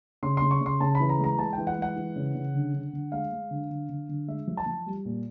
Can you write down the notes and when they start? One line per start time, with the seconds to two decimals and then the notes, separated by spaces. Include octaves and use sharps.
0.23 C#3 C6
0.37 C#3 C6
0.51 C#6
0.61 C#3 C6
0.80 C#3 A5
0.95 B5
1.00 E3
1.09 A#5
1.19 G#3 A#5
1.38 G#3 A5
1.53 E3 G5
1.67 F#5
1.77 G#3 F#5
1.96 E3
2.16 C#3
2.35 C#3
2.54 D3
2.74 D3
2.93 D3
3.12 G#3 F5
3.32 G#3
3.51 D3
3.70 D3
3.89 D3
4.09 D3
4.28 G#3 E5
4.47 F3
4.57 A5
4.66 F3
4.86 G3
5.05 A#2